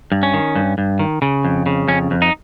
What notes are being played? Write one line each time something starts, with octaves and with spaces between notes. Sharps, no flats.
G2
C#4
D#3
G2
G2
D#3
C#3
F2
C#3
F2 C#4
F2
D#4